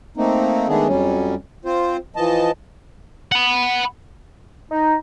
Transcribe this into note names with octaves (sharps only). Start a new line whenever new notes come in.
A3 A#3 C4 D#4
D#3 G#3 A3 B3 D4 G#4
F2 F#3 G3 C#4
C4 F4 C5
E3 F3 D#5 A5
F#5 B5
D#4